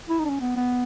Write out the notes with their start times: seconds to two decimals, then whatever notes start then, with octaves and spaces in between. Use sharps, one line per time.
0.09 E4
0.19 D#4
0.25 D4
0.30 C#4
0.40 B3
0.56 B3